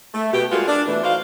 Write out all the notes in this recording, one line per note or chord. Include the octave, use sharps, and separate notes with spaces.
A3
B2 G4
G3 G#3 A#3 F4 F#4 G#4
D4
B2 E3 A3
D#4 F#4 C5 D5 F5